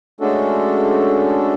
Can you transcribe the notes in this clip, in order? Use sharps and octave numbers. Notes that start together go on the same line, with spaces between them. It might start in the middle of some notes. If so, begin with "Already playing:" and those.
G#3 A3 C#4 D4 F#4 A4